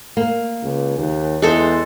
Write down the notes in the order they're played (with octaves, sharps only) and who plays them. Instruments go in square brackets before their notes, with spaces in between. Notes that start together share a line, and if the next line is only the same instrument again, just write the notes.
[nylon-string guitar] A#3
[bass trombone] C#2
D#2
[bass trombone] E2 [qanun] G#3 A4 C5